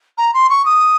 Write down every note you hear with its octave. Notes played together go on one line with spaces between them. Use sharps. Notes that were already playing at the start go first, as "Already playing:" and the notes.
A#5
C6
C#6
D#6